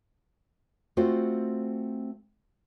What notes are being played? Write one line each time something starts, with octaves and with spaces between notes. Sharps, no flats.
A3 C4 F4 F#4 C5